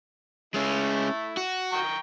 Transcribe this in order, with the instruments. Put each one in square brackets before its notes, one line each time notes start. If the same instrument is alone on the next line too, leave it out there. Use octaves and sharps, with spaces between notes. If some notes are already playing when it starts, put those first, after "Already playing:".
[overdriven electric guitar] G#3 C#4 [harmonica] A3 E4
[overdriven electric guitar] F#4
[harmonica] G5 A#5 C#6